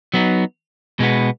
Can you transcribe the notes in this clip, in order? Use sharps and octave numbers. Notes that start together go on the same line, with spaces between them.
F#3 B3 D#4
B2 G#3 B3